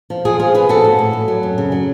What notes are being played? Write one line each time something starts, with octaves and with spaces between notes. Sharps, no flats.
F3
F3 F4 G#4
F3 F4 G#4
F3 G#4 B4
F3 F#4 A4
A2
A2
A2
F#3
F#2
C#3
F#3